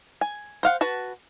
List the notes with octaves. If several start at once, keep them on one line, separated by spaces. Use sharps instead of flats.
G#5
C5 F5 F#5
F#4 B4 A5